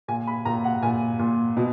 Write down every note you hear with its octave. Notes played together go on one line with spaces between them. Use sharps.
A#2 G#5
B5
A#2 A#5
F#5
A#2 G#5
A#2
B2